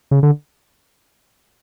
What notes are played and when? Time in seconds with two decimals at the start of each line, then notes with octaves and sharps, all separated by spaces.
0.11 C#3
0.23 D3